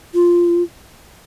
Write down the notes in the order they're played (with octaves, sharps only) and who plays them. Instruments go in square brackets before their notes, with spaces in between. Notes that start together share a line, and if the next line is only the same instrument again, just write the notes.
[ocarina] F4